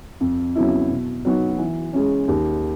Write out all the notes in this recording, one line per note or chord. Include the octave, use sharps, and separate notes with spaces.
F2
C#3 F#3 B3 E4
B2
F#3 B3 D#4 F#4
E3
G#3 C#4
D#2